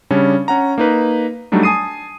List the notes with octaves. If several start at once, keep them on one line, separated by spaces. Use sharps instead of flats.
C#3 G3 C#4 D4
C#4 F#5 A#5
A#3 D#4 B4
F#3 G3 A3 D4 D#4
G#5 A5 D#6 C7 D#7